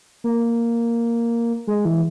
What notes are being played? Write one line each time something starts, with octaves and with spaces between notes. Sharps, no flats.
A#3
G#3
E3